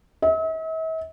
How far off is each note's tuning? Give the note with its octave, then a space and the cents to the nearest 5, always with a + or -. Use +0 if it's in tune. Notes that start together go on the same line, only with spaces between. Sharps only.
E5 -45